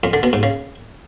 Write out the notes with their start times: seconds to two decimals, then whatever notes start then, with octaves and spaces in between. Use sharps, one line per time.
0.03 F2
0.13 D3
0.23 B2
0.33 G#2
0.43 C#3